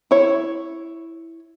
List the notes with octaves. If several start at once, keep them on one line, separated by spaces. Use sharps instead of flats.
E4 C#5